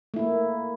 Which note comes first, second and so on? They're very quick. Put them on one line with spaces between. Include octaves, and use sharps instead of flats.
A3 E4 A#3